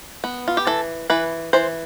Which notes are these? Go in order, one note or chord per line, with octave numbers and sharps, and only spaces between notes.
B3
F4
G4
E3 A4
E3 B4
E3 C5